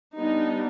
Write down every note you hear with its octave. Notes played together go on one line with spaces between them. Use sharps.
G3 B3 D4 D#4